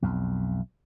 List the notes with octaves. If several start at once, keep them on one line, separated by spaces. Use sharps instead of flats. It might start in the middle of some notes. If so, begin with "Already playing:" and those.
B1 F2